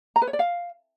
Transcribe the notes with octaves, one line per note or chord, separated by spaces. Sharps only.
A#5
B4
C#5
D5
F5